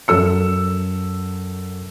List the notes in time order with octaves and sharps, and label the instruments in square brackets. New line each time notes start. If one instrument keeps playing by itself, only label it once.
[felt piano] F#2 A4 E6 C#7